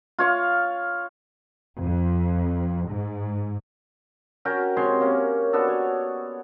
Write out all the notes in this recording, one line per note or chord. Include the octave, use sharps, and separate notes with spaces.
F4 C#5 F5
F2
G#2
C#4 F#4 A#4 G5
C3 G#3 C#5 C6
A#3 C#4
B3 D4 F#4 A4
C#5